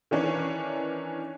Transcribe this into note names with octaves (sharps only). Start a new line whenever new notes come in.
D#3 E3 C#4 D4